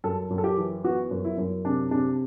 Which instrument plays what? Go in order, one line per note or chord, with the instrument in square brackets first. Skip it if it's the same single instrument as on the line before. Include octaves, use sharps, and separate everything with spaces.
[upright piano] F#2 A4
F#2
A4
G4
E3
B3 F#4
F#2
E4
F#2
C3 D4
C3 D4